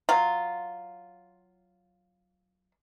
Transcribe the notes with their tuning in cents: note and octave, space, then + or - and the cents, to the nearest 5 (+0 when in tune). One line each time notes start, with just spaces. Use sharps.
F#3 +0 F4 +0